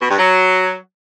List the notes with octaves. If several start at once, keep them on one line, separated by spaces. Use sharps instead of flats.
B2
G2
F#3